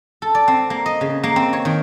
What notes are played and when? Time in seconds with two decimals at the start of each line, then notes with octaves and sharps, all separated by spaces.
0.22 A4
0.35 D5
0.48 C4
0.70 A#3
0.86 D#5
1.01 C#3
1.23 A#3
1.36 C4
1.53 C#5
1.65 D#3